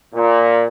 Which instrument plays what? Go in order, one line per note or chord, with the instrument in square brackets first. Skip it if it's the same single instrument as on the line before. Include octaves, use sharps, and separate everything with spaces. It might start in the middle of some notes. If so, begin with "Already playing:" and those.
[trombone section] A#2